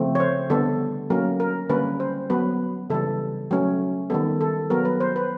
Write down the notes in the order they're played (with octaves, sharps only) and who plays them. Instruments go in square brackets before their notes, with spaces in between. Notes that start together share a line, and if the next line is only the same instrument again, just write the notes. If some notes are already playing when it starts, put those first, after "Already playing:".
Already playing: [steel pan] C#3 F3 A3 C4
C#5
C5
D3 G3 B3 A4
F#3 A#3 C#4 A#4
A#4
D3 G3 A#3 C#4 B4
C5
F#3 B3 B4
C#3 E3 G3 A4
F#3 A3 C#4
D#3 G3 B3 A4
A4
F#3 B3 A#4
B4
C5
B4